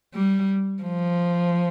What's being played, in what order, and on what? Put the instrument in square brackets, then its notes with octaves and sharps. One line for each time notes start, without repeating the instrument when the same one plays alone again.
[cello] G3
F3